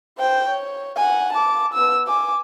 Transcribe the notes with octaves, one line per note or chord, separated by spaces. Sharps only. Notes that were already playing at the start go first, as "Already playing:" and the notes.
C5 G5
C#5
F#5 G#5
A5 D6
B3 E6
G#5 D6